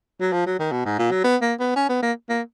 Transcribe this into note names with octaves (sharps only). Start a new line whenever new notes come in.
F#3
F3
F#3
D#3
B2
G#2
A#2
F#3
B3
A#3
B3
C#4
B3
A#3
A#3